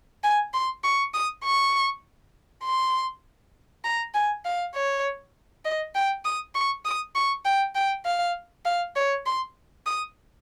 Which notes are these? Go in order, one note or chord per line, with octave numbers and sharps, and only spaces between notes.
G#5
C6
C#6
D#6
C#6
C6
A#5
G#5
F5
C#5
D#5
G5
D#6
C#6
D#6
C#6
G5
G5
F5
F5
C#5
C6
D#6